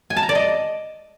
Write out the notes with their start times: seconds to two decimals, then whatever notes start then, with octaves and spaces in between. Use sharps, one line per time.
0.10 G#5
0.17 A5
0.23 A#5
0.29 D5
0.35 D#5